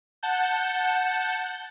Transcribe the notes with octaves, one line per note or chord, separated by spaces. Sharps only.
F#5 A5 G6